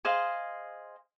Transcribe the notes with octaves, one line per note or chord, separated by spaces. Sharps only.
G#4 C5 D#5 F5